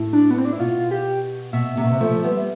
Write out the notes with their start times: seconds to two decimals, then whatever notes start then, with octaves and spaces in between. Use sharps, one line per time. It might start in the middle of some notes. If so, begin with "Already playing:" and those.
Already playing: A2
0.13 D4
0.31 B3
0.38 C4
0.45 D4
0.53 E4
0.60 B2 F4
0.91 G4
1.53 B2 E5
1.77 C3
1.84 B2
1.91 C3
2.01 F3 A3
2.24 G3 B3